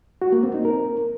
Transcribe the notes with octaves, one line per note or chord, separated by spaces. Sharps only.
F#4
A#3
C4
D#4
A#4